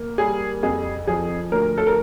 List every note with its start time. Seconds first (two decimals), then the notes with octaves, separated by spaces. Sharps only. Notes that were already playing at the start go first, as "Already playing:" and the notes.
Already playing: A#3
0.18 G3 G#4
0.63 F2 G#4
1.07 F3 G#4
1.52 D2 A#4
1.78 A4
1.87 A#4